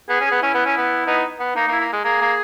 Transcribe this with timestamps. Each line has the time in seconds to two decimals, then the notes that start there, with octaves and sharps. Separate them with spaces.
0.09 B3 G#4
0.20 C#4
0.26 G#4
0.32 B3
0.42 C#4 E4
0.54 B3
0.66 C#4
0.77 B3
1.06 B3 D#4
1.39 B3
1.56 A#3 D#4
1.68 A#3
1.72 E4
1.80 A#3
1.93 G#3
2.04 A#3 G#4
2.21 A#3